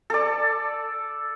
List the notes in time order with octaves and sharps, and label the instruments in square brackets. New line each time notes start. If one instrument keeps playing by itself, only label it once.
[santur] A4 D5